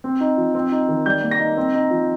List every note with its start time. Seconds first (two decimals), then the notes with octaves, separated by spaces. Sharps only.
0.04 C4
0.20 D#4
0.37 F3
0.55 C4
0.72 D#4
0.89 D#3
1.06 G3 G6
1.23 A#3
1.31 A#6
1.39 D#4
1.57 C4
1.74 D#4
1.91 F3